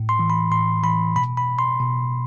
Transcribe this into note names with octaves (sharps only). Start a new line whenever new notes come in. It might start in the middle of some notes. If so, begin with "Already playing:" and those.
Already playing: A2
C6
E3
B5
A2 C6
E3 B5
B2 B5
B5
C6
B2